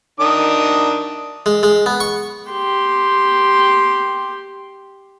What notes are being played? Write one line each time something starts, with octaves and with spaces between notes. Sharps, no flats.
D#3 D4 D#6
G#3
G#3
B3
C#6
G4 C6